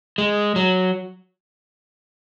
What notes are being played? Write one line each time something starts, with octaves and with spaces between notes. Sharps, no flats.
G#3
F#3